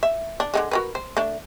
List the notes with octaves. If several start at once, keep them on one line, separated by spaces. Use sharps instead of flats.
E5
D4
D3 D#3 G#3
F#4 A#4 B4
C5
A3 D4